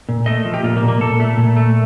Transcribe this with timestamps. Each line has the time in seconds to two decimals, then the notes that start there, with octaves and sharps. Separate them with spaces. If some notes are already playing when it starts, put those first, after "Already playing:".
0.09 A#2
0.26 A3 D#5
0.45 F3
0.54 G4
0.63 A#2 F4
0.77 A#3
0.82 A#2
0.88 A#3
1.01 A#2 A4
1.20 A3
1.37 A#2
1.56 A3